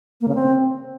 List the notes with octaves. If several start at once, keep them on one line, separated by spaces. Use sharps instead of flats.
A#3
C#3
C4